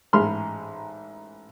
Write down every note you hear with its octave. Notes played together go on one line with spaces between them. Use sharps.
A1 G#2 B5 C6 F6